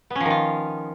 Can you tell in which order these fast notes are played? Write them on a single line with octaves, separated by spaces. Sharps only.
B3 C#4 F3 D#3 F4